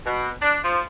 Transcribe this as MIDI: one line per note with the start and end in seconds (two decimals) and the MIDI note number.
0.06 0.30 47
0.42 0.58 62
0.64 0.82 53